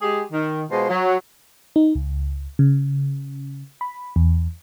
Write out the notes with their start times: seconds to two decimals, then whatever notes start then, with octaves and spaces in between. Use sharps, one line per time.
0.01 G#3 G4 G#4
0.32 D#3
0.71 B2 G#3 F4 C5
0.89 F#3
1.76 D#4
1.95 C#2
2.59 C#3
3.81 B5
4.16 E2